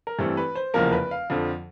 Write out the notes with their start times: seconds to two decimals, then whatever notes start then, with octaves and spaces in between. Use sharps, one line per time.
0.07 A#4
0.19 G2 E3 A3 C4 A4
0.37 B4
0.55 C5
0.74 F1 E2 C#3 F3 A#3 A#4
0.92 B4
1.11 F5
1.30 F2 D3 F3